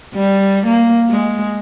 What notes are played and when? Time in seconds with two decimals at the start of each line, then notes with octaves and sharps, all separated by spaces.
0.14 G3
0.66 A#3
1.10 G#3